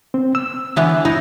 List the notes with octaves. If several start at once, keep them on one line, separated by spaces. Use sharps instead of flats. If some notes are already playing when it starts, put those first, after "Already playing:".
C4
E6
D3 E3 B3
D#4 E4